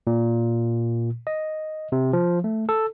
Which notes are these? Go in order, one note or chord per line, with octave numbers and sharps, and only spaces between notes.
A#2
D#5
C3
F3
A3
A4